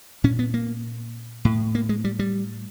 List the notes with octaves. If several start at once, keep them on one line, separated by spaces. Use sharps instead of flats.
A#2 C#4
B3
A#3
A2
A#3
G#3
G3
G3